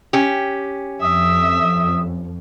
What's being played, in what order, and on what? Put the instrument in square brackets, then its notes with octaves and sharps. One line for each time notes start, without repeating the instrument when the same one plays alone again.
[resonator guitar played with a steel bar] C#4 G4
[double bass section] F2 [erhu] E5 [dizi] D#6